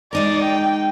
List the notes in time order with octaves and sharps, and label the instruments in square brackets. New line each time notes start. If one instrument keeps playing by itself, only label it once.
[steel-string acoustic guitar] G#3 D#4 A#4 [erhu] D5
[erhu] G5